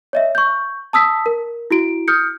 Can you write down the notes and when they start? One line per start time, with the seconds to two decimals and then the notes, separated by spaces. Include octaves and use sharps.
0.13 C#5 D#5 E5
0.35 C#6 G6
0.93 A5 D#6 E6 B6
1.26 A#4
1.71 E4 F#4 D7
2.08 D#6 F6 G6 C#7